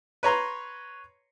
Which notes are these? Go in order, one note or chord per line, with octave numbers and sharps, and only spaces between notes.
B4 C#5 A#5 C6